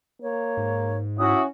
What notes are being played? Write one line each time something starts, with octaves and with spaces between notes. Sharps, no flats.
A#3 C#5
G#2
C#4 E4 F#4 D#6